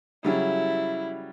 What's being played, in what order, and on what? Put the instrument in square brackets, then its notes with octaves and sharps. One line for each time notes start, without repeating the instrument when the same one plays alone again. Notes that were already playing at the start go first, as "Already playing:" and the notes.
[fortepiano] C#3 F#3 G3 [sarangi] E4